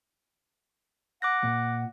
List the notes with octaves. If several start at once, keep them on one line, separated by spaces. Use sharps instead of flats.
F#5 D6 F#6 A#6
A#2